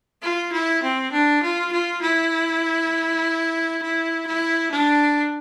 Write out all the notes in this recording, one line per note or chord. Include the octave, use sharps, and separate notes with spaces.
F4
E4
C4
D4
F4
F4
E4
E4
E4
D4